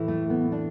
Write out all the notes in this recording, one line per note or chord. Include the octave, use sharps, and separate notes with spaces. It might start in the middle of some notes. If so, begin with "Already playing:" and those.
Already playing: A2 E3
A3
B3
D4